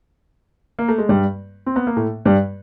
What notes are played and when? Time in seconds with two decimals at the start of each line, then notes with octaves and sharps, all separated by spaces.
0.79 A#3
0.88 A3
0.98 G#3
1.09 G2 G3
1.66 C4
1.76 B3
1.87 A#3
1.96 A2 A3
2.25 G2 G3